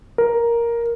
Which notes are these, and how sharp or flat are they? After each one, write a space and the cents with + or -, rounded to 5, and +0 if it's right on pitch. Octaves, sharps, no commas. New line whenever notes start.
A#4 +5